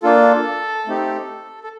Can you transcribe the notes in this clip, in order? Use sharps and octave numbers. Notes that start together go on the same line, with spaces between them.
A#3 D4 F4 A4
A3 C4 D#4 G4
A4